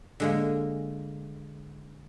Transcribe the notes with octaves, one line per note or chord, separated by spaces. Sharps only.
D3 G#3 A#3